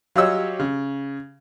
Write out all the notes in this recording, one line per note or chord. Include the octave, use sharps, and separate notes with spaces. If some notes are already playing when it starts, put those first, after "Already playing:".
F#3 F4 G4 C#5 D#5 E6
C#3